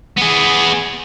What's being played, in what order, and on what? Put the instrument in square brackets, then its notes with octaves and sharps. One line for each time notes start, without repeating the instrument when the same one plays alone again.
[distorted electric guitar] B3 G#4